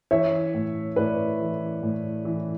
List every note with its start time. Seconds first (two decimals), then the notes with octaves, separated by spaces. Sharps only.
0.11 E3 C#5 E5
0.54 A2
0.96 A2 B4 D5
1.40 E3
1.82 A2
2.25 E3